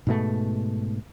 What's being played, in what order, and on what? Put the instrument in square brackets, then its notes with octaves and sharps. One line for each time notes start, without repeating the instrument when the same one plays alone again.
[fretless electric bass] G#2 B2 A3